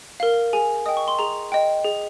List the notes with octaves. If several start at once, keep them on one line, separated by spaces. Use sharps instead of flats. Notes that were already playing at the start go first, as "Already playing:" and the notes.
A#4 F5
G#4 G#5
D#5 G5 D#6
C#6
C6
G#4 A#5
D#5 G5
G#4